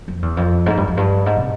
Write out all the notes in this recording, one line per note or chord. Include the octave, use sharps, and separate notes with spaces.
F2
E2
F2
G#2
G2
F2
G2
G#2
C3